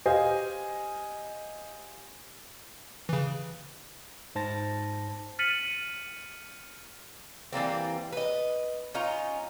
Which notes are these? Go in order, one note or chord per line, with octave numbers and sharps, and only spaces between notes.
G4 C5 D#5 F5 G#5
C#3 E3
G#2 C5 A5 A6 A#6
F6 A6 B6 C#7 D#7 F#7
E3 G3 A#3 C4
B4 D#5
C#4 D#4 F4 A#5